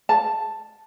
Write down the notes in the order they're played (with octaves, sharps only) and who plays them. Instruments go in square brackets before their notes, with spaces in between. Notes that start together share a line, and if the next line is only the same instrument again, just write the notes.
[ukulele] A5